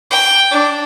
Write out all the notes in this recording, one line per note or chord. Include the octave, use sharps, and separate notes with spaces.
G5
D4